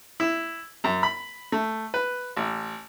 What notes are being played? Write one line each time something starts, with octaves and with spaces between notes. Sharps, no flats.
E4
F#2
B5
A3
B4
A1